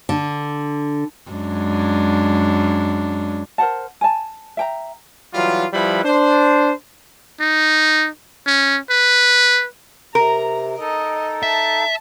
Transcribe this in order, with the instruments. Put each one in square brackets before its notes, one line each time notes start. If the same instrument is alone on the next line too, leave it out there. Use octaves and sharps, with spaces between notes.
[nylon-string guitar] D3
[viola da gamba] F#2 G#3 D4
[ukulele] A#4 C5 F#5 A5
G#5 A5
E5 G5 A#5
[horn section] E3 F#3 G3 F4
F3 G3 E4 B4 B5
D4 C5
[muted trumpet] D#4
C#4
B4
[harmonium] C3 [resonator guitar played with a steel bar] A#4 [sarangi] A#5
[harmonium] D#4 A4 [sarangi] D#5
[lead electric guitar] E5 [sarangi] A5